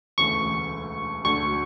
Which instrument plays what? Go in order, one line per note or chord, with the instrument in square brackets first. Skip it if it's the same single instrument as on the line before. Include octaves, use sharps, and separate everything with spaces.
[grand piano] E1 D2 C#3 E3 A3 [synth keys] C#6
[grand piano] D2 D3 F#3 [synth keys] C#6